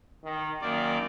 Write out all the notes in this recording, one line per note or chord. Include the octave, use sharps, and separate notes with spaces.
D#3
F#2 D#3 A#3 D5